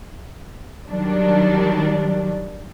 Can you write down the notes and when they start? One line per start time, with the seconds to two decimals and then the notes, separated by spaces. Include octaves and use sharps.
0.90 D#3 F#3 G3 D4